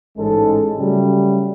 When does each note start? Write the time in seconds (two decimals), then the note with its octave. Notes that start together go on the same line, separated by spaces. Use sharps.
0.16 A1 G#2 G#3 C#4 A4
0.76 C#3 F#3 G3 A3